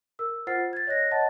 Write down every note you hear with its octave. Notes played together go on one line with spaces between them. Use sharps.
A#4 E6
F4 C5 F#5 F6 A6 C7
G#6 A6
C#5 D#5 F#6 A#6
C#5 D#5 F#5 A5 A6